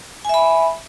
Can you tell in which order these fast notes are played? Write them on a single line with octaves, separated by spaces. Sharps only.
G#5 E5 B5